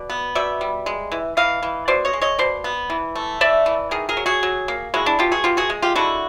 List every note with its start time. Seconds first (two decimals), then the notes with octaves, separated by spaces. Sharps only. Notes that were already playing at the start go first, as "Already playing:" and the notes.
Already playing: B2 D5
0.10 B3
0.35 B2 D5 E5
0.61 G3
0.86 G#3
1.12 E3
1.37 E3 D#5 F5
1.63 E3
1.88 B2 C5 D5
2.05 C#5 D#5
2.13 G#3
2.22 C#5 D#5
2.38 B2 C5 D5
2.64 B3
2.90 E3
3.16 A3
3.41 E3 D5 E5
3.66 E3
3.91 D#3 G#4 A#4
4.09 G#4 A#4
4.17 F#3
4.26 F#4 G#4
4.43 F#3
4.68 A#3
4.94 G#3 E4 F#4
5.06 D4 E4
5.19 B2 F4 G4
5.32 F#4 G#4
5.44 B2 F4 G4
5.57 F#4 G#4
5.70 G#3
5.82 F4 G4
5.96 D3 E4 F#4